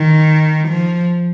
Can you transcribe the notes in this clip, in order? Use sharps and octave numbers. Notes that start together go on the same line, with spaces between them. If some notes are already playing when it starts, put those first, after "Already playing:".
Already playing: D#3
F3